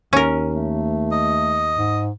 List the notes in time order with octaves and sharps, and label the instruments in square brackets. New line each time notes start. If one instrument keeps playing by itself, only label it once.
[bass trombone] D#2 [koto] C#4 A#4
[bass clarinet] A3
[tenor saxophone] D#5
[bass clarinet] G#2